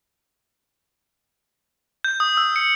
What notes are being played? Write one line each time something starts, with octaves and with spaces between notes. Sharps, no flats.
G6
D#6
E6
C#7